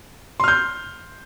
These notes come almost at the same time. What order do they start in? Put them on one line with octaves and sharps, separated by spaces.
C6 F6 G6